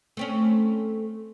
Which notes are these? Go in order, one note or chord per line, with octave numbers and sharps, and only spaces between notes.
A3 C4 C#4